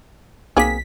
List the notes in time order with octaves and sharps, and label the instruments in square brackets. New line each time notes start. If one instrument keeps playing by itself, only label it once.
[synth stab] B1 B6 [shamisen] A#3 C4 G#4